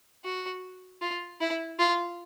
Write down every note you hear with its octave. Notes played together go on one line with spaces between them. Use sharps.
F#4
F4
E4
F4